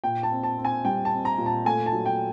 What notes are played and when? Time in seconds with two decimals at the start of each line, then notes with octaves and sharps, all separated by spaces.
0.04 A#2 G5
0.23 A5
0.31 C4
0.44 A5
0.58 C4
0.65 G#5
0.85 G3 G5
1.05 A5
1.12 C4
1.25 A#5
1.38 A#2
1.46 A5
1.65 A3 G#5
1.86 A5
1.93 F#3
2.06 G5